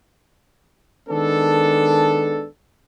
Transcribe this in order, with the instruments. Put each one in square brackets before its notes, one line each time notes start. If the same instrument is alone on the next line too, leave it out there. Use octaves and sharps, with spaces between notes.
[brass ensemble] D#3 G#3 B3 D4 A4